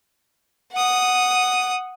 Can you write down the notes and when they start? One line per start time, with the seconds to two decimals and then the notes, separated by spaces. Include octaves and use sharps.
0.73 F#5 D#6